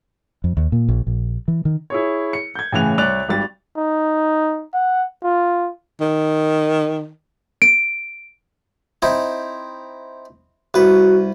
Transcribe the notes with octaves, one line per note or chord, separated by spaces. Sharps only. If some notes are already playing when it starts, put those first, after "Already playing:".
F2
D#2
A#2
A#1
A#1
E3
D#3
E4 G#4 C#5
C#7
G6 G#6
A2 C#3 E3 G#5 F#6 F7
C2 C#5 D5 F#6 A6 F7
G#1 G3 A6
D#4
F#5
F4
D#3
D7
C4 D#4 E4
C2 F#4 B4